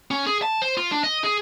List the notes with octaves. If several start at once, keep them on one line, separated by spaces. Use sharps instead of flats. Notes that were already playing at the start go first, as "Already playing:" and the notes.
C#4
G#4
A5
C5
F4
D4
D#5
G#4